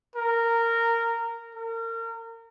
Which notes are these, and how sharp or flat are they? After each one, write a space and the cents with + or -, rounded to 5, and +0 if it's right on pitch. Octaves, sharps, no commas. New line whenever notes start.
A#4 -15
A#4 -30